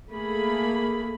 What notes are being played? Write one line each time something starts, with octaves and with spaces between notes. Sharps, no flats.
A3 A#3 G#4 B5